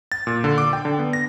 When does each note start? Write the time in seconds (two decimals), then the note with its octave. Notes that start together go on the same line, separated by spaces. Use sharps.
0.12 A6
0.27 A#2
0.44 D3
0.58 D6
0.73 G5
0.85 D3
0.99 B3
1.13 A#6